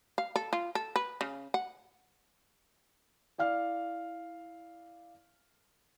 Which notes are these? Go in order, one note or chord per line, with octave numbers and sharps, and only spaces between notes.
F5
A4
F4
A4
B4
C#3
F#5
E4 D5 F5 F6